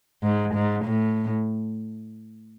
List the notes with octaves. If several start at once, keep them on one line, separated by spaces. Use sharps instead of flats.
G#2
G#2
A2